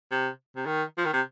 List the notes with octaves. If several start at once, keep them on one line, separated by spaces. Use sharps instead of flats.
C3
C3
D#3
F3
D#3
C3